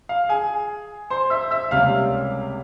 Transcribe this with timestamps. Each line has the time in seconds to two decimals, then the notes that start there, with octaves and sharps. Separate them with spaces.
0.09 F5
0.29 G#4 G#5
1.10 C5 C6
1.30 E5 E6
1.51 E5 E6
1.71 C#2 C3 G3 A#3 C#4 F5 F6